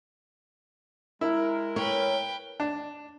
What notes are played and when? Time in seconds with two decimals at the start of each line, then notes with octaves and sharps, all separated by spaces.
1.21 G#3 E4 A#4
1.76 B4 C#5 G5
2.60 D4